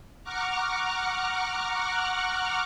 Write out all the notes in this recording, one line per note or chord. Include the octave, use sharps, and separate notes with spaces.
F#5 A#5 C#6 D6 F6 F#6